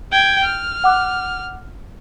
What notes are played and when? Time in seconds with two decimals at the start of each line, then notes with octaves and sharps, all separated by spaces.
0.12 G5 G#6
0.44 F6
0.84 F#5 D6 F#6